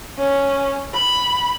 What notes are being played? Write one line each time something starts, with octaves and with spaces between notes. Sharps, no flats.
C#4
B5